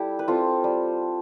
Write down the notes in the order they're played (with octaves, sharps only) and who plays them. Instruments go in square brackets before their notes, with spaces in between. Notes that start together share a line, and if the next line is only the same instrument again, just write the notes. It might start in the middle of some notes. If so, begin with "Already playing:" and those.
Already playing: [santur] G3 E4 G4 A4
B4
C4 F4 A4
G3